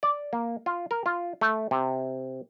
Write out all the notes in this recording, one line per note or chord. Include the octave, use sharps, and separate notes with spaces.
D5
A#3
F4
A#4
F4
A3
C3